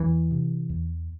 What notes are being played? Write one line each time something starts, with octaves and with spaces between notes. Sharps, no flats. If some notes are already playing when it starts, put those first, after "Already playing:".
Already playing: E2 E3
C3
E2